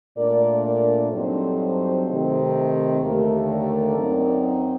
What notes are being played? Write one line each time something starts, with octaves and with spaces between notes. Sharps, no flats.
A#2 A3 D4 A#4 D5
A#4 D5
G2 F#3 C4 D#4 A4 C5
C3 D#3 A3 C4 D#4
D#2 D3 A3 G4 A#4
A#4 D5
F#2 F#3 C4 D#4